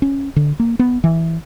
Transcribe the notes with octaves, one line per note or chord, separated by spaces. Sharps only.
C#4
D3
A#3
B3
E3